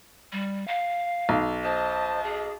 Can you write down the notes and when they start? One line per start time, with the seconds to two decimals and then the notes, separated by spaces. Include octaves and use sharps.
0.32 G3
0.68 F5
1.29 B1
1.63 C5 D#5 A5
2.24 G#4